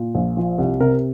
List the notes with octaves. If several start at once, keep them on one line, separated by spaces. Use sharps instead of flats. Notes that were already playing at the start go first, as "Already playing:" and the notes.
Already playing: A#2
A#1
F3
C2
C3 A#4